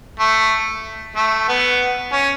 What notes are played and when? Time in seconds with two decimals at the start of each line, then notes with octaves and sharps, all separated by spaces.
0.20 A3
1.16 A3
1.48 B3
2.12 C#4